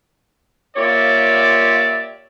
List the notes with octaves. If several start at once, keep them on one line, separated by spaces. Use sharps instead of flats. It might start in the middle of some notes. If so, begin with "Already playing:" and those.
A#3 F4 G4 C#5 D5 E5